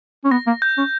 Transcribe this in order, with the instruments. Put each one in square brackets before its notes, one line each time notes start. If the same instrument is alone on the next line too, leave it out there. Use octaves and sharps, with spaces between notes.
[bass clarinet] C#4
[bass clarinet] B3 [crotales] A#6
[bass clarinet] A#3
[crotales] G6
[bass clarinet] C#4